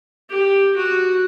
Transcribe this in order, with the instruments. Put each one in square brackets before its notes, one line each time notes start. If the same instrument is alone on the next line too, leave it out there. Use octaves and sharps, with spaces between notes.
[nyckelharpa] G4
F#4